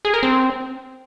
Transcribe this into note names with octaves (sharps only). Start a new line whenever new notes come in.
G#4
A#4
C4